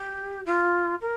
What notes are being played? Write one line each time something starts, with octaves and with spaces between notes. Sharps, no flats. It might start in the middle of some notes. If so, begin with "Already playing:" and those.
Already playing: G4
F4
A#4